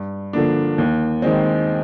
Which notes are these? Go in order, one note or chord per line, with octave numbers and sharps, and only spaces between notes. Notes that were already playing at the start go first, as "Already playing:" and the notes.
Already playing: G2
D3 F3 A#3 D4
D#2
D#3 G#3 C4